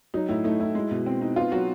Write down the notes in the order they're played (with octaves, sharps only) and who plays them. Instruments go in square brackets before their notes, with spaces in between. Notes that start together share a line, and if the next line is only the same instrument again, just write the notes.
[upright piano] F#3 [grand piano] D#4
[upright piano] A2 [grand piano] E4
[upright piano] A3 [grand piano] D#4
[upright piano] A2 [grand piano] E4
[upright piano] G#3
B2
C4
D#4
[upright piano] B3 [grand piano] F4
[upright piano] F#3 [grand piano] F#4